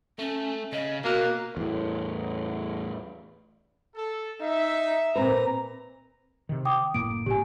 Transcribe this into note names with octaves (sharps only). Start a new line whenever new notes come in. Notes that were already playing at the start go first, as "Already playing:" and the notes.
A3 C#4
C#3 D#5
B2 A#3 F#4 F#6
E2 A2
A4
D#4 E5
A#2 C4 B4 A#5
C3 D#3
G5 D6 D#6
F#1 A2 A#3 D7
G#1 A#2 C#3 G4 G#5